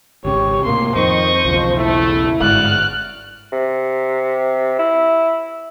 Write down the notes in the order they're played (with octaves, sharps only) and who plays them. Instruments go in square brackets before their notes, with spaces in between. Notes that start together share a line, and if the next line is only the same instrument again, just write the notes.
[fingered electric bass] G#1 C#2 C#3 [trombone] G4 [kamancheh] C#5
[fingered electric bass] A2 C3 [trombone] A#3 [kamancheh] C6
[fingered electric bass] F2 [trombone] D#3 [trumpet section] D#4 D#5 C#6 [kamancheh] C5
[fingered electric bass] B1 E2 C#3 [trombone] F3
[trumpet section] A3 [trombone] E4
[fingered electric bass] G1 G#2 G#3 [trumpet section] F#4 D5 [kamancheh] F6 F#6
[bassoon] C3
E4